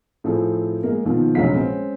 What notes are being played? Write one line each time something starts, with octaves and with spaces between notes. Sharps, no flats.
A2 F3 C4 G#4 A4
G#3 A#3
B2 D#3 F3 C4
F1 A#1 F#3 G#3 F5 B6
G#3 C4 C#4